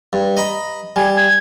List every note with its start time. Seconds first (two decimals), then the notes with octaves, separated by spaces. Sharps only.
0.13 G2
0.37 D#5 A#5 B5
0.96 G3 G#5
1.17 G#6